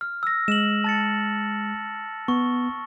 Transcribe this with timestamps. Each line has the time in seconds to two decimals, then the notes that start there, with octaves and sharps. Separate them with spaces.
0.01 F6
0.23 E6 A#6
0.48 G#3 E7 F#7
0.84 A5 A6 C#7
2.28 B3 C#6